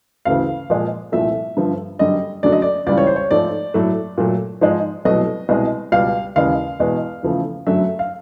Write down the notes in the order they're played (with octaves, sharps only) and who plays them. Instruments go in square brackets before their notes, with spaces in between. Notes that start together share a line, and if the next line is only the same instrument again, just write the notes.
[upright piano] D2 C#3 E3 A3 F5
A#2 F3 G#3
C2 A#2 F3 A3 E5
G2 D3 F3
F#2 D3 G3 D#5
F#2 D3 F#3 A3 D5
D#5
D5
C#2 C#3 E3 G3 D5
C#5
C5
C#5
G#2 F3 A3 D5
A2 F#3 A3
A#2 F#3 A3
G#2 F3 G#3
C2 B2 F#3 A3 D#5
C2 B2 G#3
C#2 B2 G3 F5
D#2 C#3 E3 G#3 F5
E2 B2 G#3
E2 C#3 F3 A3
F#2 D3 F#3 A3 E5
F5